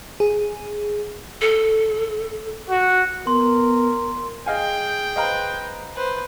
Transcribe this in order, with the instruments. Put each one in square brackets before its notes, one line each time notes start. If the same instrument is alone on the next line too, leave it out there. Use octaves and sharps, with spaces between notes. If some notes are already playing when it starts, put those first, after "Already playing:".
[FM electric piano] G#4
[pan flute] A4
[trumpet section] F#4
[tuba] B3 [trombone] A#4 [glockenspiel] C6
[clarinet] G#4 [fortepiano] D#5 F5 G#5 [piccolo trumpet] G5
[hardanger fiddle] B4 C5 [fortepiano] D#5 F5 A#5
[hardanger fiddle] B4 C5